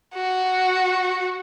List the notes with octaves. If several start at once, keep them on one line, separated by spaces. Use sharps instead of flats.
F#4